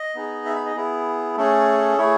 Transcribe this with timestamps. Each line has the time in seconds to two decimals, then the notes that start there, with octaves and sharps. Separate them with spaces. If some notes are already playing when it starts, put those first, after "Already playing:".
Already playing: D#5
0.15 B3 D#4 G#4
0.46 E5
0.55 B5
0.66 D#5
0.76 B3 E4 G#4
1.37 A3 C#4 G#4 A4
1.97 A3 E4 G#4 C#5